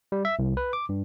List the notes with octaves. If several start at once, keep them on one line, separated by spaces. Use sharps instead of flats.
G3
E5
C2
B4
D6
G2